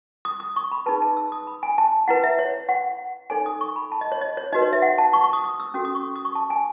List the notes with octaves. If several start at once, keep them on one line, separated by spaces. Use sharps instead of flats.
D#6
D#6
C#6
B5
D#4 G#4 B4 A5
A5
E6
D#6
B5
G#5
A5
E4 B4 F#5
E5
C#5
F#5
D#4 A4 C#5 G#5
D#6
C#6
B5
A5
D#5
C#5
D#5
C#5
D#4 F#4 B4 D#5
C#5
E5
F#5
A5
C#6
C#6
D#6
D#6
E6
C#4 F#4 A4 D#6
D#6
C#6
D#6
C#6
A5
G#5